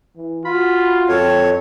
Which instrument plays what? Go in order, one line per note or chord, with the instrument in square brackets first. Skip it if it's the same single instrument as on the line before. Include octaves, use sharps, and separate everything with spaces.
[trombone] E3
[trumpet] F4 [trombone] F#4 [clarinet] B5
[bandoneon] F2 C#5 [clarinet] C4 [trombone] A4